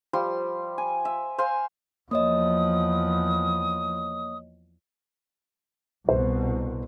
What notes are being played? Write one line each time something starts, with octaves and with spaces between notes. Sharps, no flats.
F3 G3 C6
G#5
E5
C5 F5 G#5 C6
E2 F3 A#3 C#5 D#5 D#6
C2 B2 C5